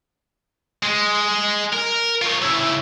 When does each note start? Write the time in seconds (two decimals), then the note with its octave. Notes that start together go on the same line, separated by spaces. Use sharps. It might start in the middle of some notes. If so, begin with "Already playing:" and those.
0.83 G#3
1.73 A#4
2.22 F4 C#5
2.42 C#3 E4